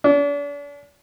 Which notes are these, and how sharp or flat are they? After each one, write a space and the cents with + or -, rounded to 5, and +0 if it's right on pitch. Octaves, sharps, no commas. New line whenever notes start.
D4 -40